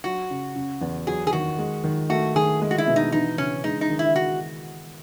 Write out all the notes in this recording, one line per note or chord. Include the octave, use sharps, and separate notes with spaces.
F#3 F#4
C#3
C#3
E2
F#3 G#4
G#4
D#3 F#4
G#3
D#3
A3 F#4
D#3 G#4
G#3
F#4
E4
B2
D#4
E3 D#4
C#3 C#4
G#3 D#4
D#4
D#3
E4
F#4